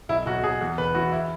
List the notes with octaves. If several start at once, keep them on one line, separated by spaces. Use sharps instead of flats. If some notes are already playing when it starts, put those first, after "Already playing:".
B1 E4
B1 F#4
B1 G#4
E2
E1 B4
E3 F#4
E4